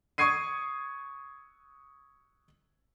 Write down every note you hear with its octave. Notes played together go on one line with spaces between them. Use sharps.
C#6 D#6 G#6 C7 D#7